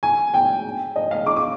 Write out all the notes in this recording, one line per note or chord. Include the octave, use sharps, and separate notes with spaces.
G#5
G5
D#5
F5
D6
D6